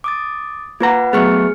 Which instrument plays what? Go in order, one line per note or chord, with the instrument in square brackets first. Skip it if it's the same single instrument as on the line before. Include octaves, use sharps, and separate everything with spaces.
[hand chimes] D6 D#6 A6
[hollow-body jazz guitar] A#3 A#5 [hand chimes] F4 B4 F#5
[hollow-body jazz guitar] F#3 A3 B3 [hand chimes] G#4 F6 C#7